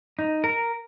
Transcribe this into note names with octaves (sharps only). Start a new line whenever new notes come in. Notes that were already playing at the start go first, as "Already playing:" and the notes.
D#4
A#4